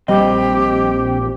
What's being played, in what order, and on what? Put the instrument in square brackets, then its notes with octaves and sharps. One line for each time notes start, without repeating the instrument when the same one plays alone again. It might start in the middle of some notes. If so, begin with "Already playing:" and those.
[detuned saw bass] A#1 [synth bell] G3 D#5 [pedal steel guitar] C4 [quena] G4